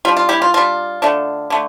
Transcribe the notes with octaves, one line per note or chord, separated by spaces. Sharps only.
G3 D4 F4
F4
E4 G4
F4
G3 D4 F4
D3 A3 D4
D3 A3